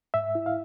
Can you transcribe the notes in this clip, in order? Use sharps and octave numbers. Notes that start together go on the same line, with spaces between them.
G#2 E5
E4
F5